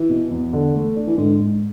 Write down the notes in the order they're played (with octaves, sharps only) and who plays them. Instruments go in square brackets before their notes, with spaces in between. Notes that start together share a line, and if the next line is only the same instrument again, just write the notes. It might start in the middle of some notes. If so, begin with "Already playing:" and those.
Already playing: [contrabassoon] E3
[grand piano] B2
E2
D3
A3
D4
[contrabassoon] E3
[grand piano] G#2 [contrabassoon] D3
[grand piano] G#2